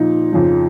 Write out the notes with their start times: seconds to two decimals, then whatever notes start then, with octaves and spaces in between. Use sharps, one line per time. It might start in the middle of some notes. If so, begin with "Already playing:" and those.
Already playing: A#2 F3 D#4
0.33 F2 C#3 F3